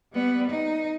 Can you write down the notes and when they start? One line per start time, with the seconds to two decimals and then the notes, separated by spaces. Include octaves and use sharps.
0.13 G3 B3
0.50 D#4